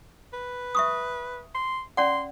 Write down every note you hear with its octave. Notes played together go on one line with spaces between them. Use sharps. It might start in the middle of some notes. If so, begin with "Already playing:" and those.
B4
E5 C#6 D#6
C6
C#4 D5 F#5 C6